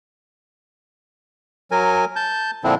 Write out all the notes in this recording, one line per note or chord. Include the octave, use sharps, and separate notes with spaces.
F#3 A#4 G#5
A5 G6
A#2 D3 F3 C4 D4 E4